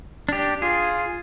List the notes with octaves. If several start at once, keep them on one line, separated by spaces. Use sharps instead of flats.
D4 G4
F4 G#4